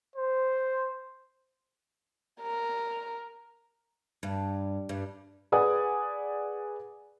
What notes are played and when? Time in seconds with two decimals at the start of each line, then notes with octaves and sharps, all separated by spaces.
0.16 C5
2.41 A#4
4.23 G2
4.89 G2
5.52 G#4 B4 D5 F#5 G#5 D#6